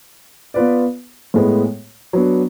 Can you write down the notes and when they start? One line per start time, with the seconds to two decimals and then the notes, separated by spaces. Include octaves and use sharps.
0.54 B3 F4 B4 D5
1.34 A2 G#3 B3
2.13 F#3 B3 D4